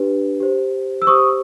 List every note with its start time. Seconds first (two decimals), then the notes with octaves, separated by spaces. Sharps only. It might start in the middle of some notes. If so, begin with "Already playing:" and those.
Already playing: D4 G4 B4
0.40 G4 C5
1.02 E6
1.07 G4 C5 C#6 D#6